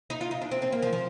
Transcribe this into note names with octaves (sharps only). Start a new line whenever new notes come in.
D#4
F4
D#4
D4
C4
C4
A#3
F3
F3